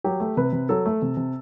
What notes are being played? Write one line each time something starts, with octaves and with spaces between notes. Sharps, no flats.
F#3 G4
A3
C3 B4
C3
F#3 A4
A3
C3
C3